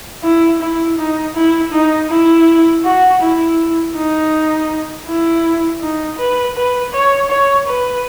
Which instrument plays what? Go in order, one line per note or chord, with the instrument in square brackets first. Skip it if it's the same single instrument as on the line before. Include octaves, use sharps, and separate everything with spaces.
[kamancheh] E4
E4
D#4
E4
D#4
E4
F#4
E4
D#4
E4
D#4
B4
B4
C#5
C#5
B4